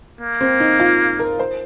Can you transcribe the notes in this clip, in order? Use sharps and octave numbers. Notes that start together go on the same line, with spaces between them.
A#3
C4
D#4
F4
A#4
C5